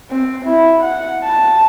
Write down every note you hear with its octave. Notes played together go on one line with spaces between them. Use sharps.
C4
E4
F#5
A5